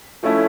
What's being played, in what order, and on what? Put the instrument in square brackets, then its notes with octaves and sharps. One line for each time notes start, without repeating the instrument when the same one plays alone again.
[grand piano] F3 A3 C#4 E4